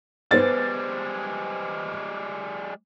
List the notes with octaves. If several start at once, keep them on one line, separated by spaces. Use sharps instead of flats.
G3 G#3 B3 C5 A6